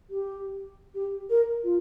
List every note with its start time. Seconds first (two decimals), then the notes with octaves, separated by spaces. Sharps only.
0.10 G4
0.95 G4
1.30 A#4
1.64 F4